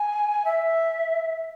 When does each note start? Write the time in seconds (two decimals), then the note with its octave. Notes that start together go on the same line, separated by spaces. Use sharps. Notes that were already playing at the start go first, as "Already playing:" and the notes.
Already playing: G#5
0.44 E5